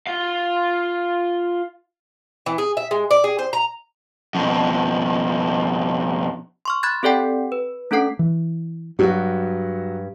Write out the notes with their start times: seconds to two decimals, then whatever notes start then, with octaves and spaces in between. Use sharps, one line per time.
0.08 F4 F5
2.46 E3
2.58 G#4
2.77 E5
2.91 G#3
3.11 D5
3.24 G#4
3.39 C5
3.53 A#5
4.35 F2 B2
6.65 C6 C#6 F6
6.83 B5 F#6 G#6 A6
7.03 C4 G4 A4 D5 F#5 G5
7.52 B4
7.91 A3 C#4 D4 A4 F#5 C7
8.19 E3
8.99 G2 F#3 F#4